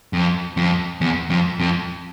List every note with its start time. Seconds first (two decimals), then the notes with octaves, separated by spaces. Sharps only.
0.13 F2
0.57 F2
1.01 E2
1.30 F2
1.60 F2